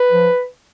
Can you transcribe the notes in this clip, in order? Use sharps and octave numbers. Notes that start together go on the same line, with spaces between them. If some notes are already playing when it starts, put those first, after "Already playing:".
Already playing: B4
F3